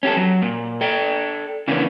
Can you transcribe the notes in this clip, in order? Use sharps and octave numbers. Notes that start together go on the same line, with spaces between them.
C#4 G4 A4
F#3
A#2
A4 D5 G5
C#3 E3 A#3 B3 C#4 D4